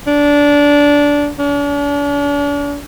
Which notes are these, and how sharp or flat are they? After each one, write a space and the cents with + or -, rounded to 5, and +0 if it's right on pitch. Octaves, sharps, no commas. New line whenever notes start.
D4 -20
D4 -45